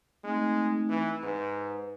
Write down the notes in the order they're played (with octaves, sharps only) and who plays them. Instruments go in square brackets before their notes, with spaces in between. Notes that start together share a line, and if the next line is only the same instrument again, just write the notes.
[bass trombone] G#3 [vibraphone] A3 C4 D#4
[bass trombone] E3
[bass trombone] G#2 [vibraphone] B4